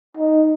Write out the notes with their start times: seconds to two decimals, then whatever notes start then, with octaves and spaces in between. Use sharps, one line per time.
0.17 D#4